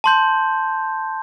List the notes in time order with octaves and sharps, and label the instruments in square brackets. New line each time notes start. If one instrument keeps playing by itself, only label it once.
[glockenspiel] A5 C6 G6